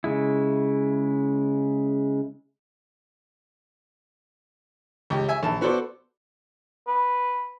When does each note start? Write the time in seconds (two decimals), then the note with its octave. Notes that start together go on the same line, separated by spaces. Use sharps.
0.04 C#3 G#3 E4
5.10 C#2 G4
5.29 E5 G#5
5.43 A#1 A5
5.61 B3 F#4 A4 C5 D5
6.88 B4